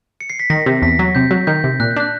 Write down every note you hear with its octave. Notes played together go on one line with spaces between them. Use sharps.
C#7
C7
B6
D#3 A#6
C3
E2 B6
F#3
C3 G6
F#3
D#3 G6
C3
A#2 F#6
G6
D4 F#6